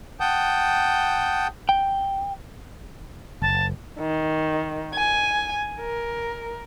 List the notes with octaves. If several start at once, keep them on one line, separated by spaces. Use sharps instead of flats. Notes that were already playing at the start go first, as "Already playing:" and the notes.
F#5 G5 A5 D#6 G6
G5
F#1 A5
D#3
G#5
A#4